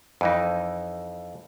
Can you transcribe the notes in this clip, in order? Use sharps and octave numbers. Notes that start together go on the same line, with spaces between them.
F2 E3 D#4